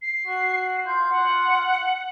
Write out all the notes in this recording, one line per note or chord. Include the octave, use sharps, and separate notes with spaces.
C7
F#4
F4 G6
F#5